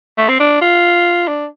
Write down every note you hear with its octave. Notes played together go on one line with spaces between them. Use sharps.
A3
C4
D4
F4
D4